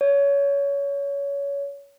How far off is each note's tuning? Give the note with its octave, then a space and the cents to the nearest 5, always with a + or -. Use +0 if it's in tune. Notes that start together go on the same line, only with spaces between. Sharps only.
C#5 +25